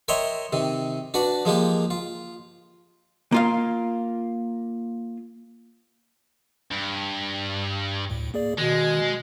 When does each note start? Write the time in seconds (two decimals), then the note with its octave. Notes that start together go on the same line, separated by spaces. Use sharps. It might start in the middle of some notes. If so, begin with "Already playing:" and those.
0.08 A#4 C#5 D#5 E5 G5 C6
0.53 C3 D#3
1.14 D4 F#4 B4 D5
1.45 F3 G#3 A#3 G4
1.90 F4
3.32 A#3 F4 F5
6.71 G2
8.10 D2 A2
8.34 A#3 G#4 D5
8.58 B2 D#3 G#3